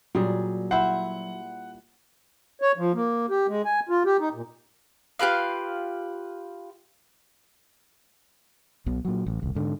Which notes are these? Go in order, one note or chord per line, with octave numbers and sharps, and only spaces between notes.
A#2 F#3 G3 G#4
E4 C5 F#5
C#5
F3
A#3
G4
G#3
G#5
F4
G4
D#4
A#2
F4 G4 B4 F5
B1 B2
A#2 F#3
A1
D#1 C2
G#2 D3